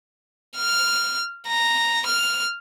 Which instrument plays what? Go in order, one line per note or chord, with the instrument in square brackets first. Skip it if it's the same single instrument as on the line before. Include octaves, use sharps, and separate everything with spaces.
[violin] F6
A#5
F6